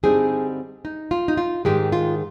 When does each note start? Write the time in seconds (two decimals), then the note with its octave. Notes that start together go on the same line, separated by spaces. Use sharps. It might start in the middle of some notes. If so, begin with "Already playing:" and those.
0.03 G2 D3 G3 C4 D#4 G#4
0.85 D#4
1.11 F4
1.28 D#4
1.37 F4
1.65 G#2 D#3 G#3 G4
1.92 F4